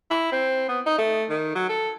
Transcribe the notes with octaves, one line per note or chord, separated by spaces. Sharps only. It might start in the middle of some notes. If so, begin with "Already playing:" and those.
E4
C4
B3
D#4
A3
D#3
F#3
A4